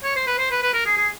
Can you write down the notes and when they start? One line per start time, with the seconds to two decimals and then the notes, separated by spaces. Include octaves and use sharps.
0.04 C#5
0.16 C5
0.27 B4
0.38 C5
0.51 B4
0.62 B4
0.74 A#4
0.86 G#4
0.97 G#4